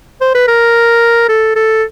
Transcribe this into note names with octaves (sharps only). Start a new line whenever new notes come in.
C5
B4
A#4
A4
A4